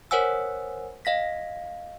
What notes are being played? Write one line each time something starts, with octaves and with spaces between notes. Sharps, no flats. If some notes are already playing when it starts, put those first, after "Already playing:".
A#4 C5 C#5 F#5 G#5 E6
D#5 F5 A#6 B6